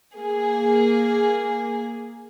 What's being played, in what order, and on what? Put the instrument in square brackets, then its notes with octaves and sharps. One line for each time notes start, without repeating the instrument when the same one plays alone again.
[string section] A#3 G#4